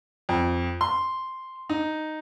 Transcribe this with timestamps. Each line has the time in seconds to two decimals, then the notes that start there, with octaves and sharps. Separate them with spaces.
0.29 F2
0.81 C6
1.70 D#4